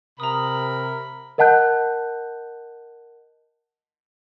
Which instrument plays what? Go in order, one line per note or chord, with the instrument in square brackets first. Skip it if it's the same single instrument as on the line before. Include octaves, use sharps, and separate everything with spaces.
[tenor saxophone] C3 [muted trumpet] A#4 [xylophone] A#5 D#6 [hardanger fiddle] B5
[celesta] A#4 D#5 F#5 A5 F#6 G6